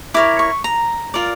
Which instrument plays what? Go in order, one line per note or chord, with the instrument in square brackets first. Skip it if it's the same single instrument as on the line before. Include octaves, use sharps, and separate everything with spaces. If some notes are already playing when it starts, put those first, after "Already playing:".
[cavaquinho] E4 A#4 C#5 D6
C#6
A#5
F4 A#4 D5